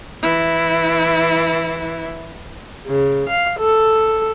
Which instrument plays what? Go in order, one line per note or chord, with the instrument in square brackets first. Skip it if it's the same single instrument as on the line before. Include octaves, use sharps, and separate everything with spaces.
[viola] E3 E4
[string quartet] C#3
F5
A4